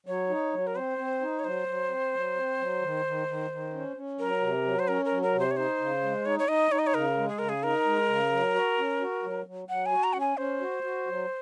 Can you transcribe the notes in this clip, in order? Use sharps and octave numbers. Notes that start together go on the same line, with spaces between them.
F#3 C#5
D#4
F#3
A#4
C4 C5
C4
D#4
C#5
F#3 C5
F#3
C4
F#3
C4
F#3
D#3
D#3
D#3
D#3
C#4
C#4
F#3 A#4
C3
F#3
C5
C#4 A#4
A#4
F#3
A#4
C3
C5
C#5
D#4 C5
C#3
G#3
D#4 C#5
C#5
D#4 D#5
D#4 C#5
D#5
C#5
C#3 A#4
G#3
G#4
C#3 A#4
G#4
D#4 A#4
G#3
C#3
F#3
F#4
C#4
F#4
F#3
F#3
F#3 F#5
G#5
F#4
A#5
C#4 F#5
G#5
C#4 C5
F#4
F#4
F#3